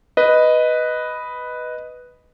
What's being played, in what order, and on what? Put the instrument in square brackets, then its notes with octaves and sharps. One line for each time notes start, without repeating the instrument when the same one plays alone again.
[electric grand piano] B4 D#5